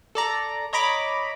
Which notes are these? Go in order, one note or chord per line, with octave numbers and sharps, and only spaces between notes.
A4 D5 A#5
C#5 D#5 A#5 B5 D6